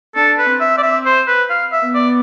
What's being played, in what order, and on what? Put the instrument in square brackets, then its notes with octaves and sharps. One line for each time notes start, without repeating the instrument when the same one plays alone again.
[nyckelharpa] D4 [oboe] A4
[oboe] B4
[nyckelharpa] C4
[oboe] E5
D5
E5
C5
B4
F5
E5
[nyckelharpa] B3
[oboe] D5